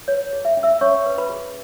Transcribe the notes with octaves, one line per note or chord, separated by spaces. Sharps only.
B4 C#5
G#4
E5
C#4
E5 E6
C#4 C#5 C#6
B4
B4 B5
G#4